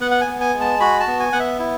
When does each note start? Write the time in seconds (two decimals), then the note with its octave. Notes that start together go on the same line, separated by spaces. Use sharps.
0.01 B3 F#5
0.11 F#5
0.21 G#5
0.27 B3
0.41 G#5
0.54 G#3
0.60 A5
0.80 F#4 B5
1.00 A5
1.07 B3
1.20 G#5
1.33 B3 F#5
1.40 E5
1.59 E4